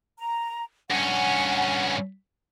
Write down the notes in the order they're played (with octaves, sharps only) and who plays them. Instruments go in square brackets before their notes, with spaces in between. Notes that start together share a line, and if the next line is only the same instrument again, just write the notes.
[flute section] A#5
[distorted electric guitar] G2 C#4 [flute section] F#5 G#5